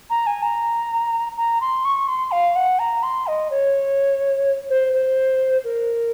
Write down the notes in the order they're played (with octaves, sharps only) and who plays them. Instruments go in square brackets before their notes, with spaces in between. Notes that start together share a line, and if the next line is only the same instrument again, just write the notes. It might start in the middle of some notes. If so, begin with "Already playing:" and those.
[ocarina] A#5
G#5
A#5
A#5
C6
C#6
C6
F5
F#5
A#5
C6
D#5
C#5
C5
C5
A#4